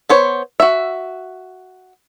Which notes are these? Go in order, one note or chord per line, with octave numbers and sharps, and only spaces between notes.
B3 C5 C#5
F#4 E5